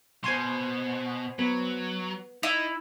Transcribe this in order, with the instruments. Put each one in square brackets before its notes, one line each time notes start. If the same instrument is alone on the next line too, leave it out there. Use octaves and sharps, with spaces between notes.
[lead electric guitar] B2 [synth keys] C5 G#5 C6
[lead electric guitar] F#3 [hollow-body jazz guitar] B3
[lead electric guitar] D#4 [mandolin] E4 [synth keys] D#6